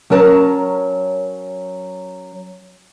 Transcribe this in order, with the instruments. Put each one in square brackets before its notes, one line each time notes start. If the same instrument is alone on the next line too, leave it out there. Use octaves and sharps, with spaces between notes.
[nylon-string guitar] F#3 C#4 A#4 A5